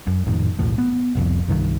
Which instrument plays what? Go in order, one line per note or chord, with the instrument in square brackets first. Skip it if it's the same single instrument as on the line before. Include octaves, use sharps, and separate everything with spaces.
[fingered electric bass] F#2
G#1 F2 A2 D#3
B1 E2 A2
B3
F1 C2 F2
C2 G2 D#3